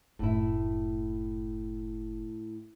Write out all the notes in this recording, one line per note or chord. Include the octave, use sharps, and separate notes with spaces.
F#1 A2 E4